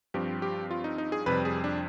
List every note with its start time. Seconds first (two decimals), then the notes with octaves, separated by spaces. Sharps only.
0.14 G2 F3 C4 G4
0.42 G4
0.71 F4
0.84 D#4
0.98 D#4
1.12 G#4
1.26 F2 C3 G3 B4
1.45 G#4
1.64 D4